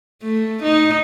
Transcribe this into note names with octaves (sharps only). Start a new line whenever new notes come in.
A3
D#4